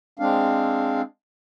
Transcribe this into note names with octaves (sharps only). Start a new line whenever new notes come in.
G#3 C4 D4 F5